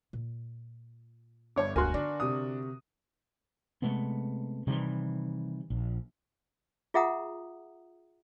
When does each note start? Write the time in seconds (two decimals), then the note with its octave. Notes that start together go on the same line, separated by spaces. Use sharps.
0.13 A#2
1.56 G1 G2 C#5 D6
1.76 E1 D2 F#4 A#4 G#5 C6 F#6
1.94 D3 D4 D#4
2.20 C3 D#6
3.82 C3 G#3 A3 B3
4.67 C3 D#3 E3 G3
5.70 A#1
6.94 F4 G#4 E5 F#5 A#5 D#6